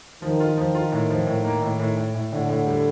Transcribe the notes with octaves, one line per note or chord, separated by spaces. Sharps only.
D#3 F3
F4
F3
F4
A2
F3
A2
A#3
A2
A2
A2
A2
A2 D3
A2
G3